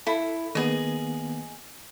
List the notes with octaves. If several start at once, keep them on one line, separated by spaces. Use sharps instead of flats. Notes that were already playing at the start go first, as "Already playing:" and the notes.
E4 A4
D#3 A#3 B3 G#4 D#5